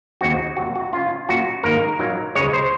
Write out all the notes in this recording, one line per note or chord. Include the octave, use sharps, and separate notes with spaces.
D#2 C#3 G#3 C4 F4 F#4
C3 F#3 A#3 F#4
F#4
C#3 G#3 C#4 F4
A#2 F#3 C#4 F4 F#4
G#2 D#3 A#3 D#4 A#4
A#2 F#3 A#3 D#4
C#2 C#3 G#3 C#5
C5